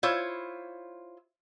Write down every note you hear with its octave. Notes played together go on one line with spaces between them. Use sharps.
E4 F4 C5 C#5